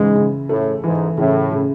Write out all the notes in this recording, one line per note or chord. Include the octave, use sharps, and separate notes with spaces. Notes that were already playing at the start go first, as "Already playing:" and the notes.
Already playing: G#2 C#3 E3 G#3
C#3
A2 A3
G#2 E3
A2 C#3
C#3